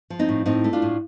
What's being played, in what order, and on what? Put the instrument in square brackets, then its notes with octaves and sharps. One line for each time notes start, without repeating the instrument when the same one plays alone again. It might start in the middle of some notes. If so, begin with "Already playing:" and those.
[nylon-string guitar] F3
C4 D#4
A2
A2 C4 D#4
A3
D4 F4
A2